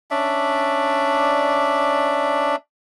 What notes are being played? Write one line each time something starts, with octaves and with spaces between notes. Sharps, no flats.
C#4 D4 D5 E5